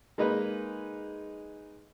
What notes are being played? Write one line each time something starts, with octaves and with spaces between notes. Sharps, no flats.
G#3 A#3 D#4 B4